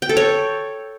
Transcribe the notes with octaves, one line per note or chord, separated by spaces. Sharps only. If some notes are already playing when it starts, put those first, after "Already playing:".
G5
A4
C#5